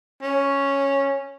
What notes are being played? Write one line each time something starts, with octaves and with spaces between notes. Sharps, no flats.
C#4